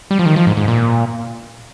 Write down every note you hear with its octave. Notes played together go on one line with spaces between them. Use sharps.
G3
F3
D#3
F3
G#2
G#2
A#2